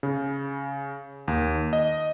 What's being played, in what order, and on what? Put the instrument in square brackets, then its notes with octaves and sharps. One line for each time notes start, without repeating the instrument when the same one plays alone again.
[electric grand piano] C#3
D#2
D#5